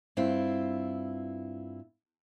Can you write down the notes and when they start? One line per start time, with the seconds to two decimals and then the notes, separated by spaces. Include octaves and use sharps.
0.17 G2 C4 E4 F4